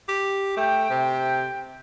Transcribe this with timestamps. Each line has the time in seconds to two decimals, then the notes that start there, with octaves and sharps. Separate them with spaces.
0.08 G4
0.57 A3 G5
0.90 C3